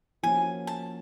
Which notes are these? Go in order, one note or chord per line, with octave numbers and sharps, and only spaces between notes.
F3 A#3 C#4 F#4 G#5
A5